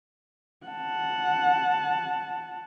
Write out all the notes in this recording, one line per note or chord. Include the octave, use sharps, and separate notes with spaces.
F#5 A5